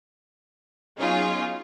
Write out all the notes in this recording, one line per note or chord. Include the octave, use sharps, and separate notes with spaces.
F#3 B3 C#4 D#4 F4 G#4